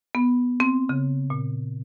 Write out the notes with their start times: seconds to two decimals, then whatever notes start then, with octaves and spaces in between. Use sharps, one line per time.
0.15 B3
0.60 C4
0.89 C#3
1.30 A#2